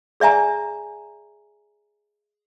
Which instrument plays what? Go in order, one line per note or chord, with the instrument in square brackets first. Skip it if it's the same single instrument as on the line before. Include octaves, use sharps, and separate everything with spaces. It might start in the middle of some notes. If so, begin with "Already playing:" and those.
[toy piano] G#4 D5 E5 G#5 A#5